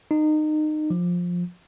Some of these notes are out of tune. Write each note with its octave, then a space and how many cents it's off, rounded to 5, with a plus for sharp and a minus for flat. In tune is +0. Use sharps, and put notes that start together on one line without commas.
D#4 -25
F3 +15